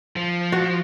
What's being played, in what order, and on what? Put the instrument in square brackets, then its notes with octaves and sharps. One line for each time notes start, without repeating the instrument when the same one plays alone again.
[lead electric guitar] F3
[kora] F#4